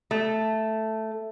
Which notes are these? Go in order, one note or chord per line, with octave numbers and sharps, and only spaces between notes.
A3